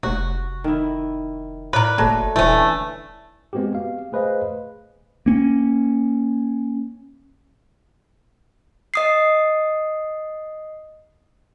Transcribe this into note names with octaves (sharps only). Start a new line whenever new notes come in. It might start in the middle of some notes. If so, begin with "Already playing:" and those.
F1 F#4
D#3 E4
A2 A#4 B4 D5
F#1 F#3 A3
D#1 D3 E3 A3 C#4
G#3 B3 C4 F#4 G4
F5
A3 G#4 B4 C5 D#5 F5
A#3 C#4
D#5 D#6 C7